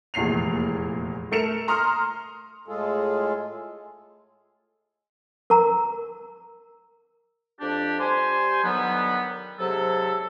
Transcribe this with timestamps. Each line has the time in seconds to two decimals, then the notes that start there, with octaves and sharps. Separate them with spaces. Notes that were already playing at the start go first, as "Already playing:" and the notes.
0.14 F1 E2 A#2 C7 F7
1.31 A3 A4 A#4 C#7 E7 F7
1.68 A#5 C6 D#6 F6
2.68 A2 G#3 F4 G#4 A4
5.50 A#4 A#5 E6
7.60 F2 D4 G4
7.99 G3 C5 G#5
8.64 D3 D#3 F#3 G3 B3
9.59 G#2 C3 F#3 A4